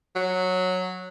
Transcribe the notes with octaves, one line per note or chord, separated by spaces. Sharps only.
F#3